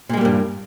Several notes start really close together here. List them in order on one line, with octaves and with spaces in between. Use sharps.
A#2 G#3 G3 A#3 G2